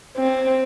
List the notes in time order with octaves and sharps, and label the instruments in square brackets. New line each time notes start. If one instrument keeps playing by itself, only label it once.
[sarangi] C4